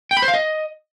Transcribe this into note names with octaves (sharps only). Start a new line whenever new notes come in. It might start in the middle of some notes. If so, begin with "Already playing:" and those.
G5
B5
C5
F5
D#5